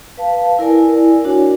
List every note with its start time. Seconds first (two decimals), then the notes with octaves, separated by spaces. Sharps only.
0.17 B4 F5 A5
0.59 E4 A#4 D5 G#5
1.24 D4 F#4 C#5 G#5